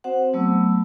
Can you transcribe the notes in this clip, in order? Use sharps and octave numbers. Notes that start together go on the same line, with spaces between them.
C4 F#4 C5 F#5
F#3 A3 B3 E6